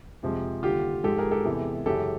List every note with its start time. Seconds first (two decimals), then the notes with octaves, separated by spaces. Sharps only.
0.23 F2 C3 F3 G#3
0.63 D#2 D3 G3 F4 G4
1.04 G#2 F3 G#3 G4 A4
1.18 G#4 A#4
1.31 G4 A4
1.45 E2 C3 E3 G#3
1.86 F#2 C#3 E3 G#3 G4 A4